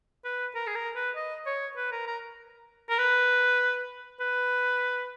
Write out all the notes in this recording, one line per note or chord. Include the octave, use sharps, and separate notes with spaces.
B4
A#4
G#4
A#4
B4
D#5
C#5
B4
A#4
A#4
A#4
B4
B4